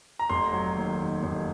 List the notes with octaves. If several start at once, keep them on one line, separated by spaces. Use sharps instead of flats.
A#5
F1 C6
F#3
D#2
D#3
F1